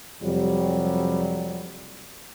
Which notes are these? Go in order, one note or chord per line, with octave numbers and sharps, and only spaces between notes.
F2 C3 F#3 G3